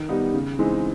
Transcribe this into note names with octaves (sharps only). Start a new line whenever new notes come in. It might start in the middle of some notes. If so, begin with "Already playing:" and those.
Already playing: D#3
G3 B3 D#4
C#3
E3 G#3 C4 D#4